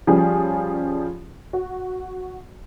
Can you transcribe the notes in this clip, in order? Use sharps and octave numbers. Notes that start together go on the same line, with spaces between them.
F3 G3 C#4 G#4
F#4